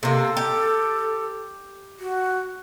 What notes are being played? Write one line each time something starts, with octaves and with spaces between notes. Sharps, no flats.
C3 A#3 A4
G4
F#4